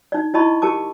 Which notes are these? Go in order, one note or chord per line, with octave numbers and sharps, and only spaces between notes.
D#4 D5
E4 D5 D#5 A5 B5 C#6
G4 A#4 A5 D6